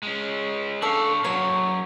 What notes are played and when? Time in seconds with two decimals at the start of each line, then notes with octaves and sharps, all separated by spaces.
0.03 G#3 C#4
0.82 D4 A4 F5 C#6
1.24 F#3 A#3 C#5